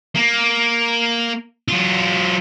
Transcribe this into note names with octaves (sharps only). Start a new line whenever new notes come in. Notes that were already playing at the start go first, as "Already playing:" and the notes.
A#3
F#3 F4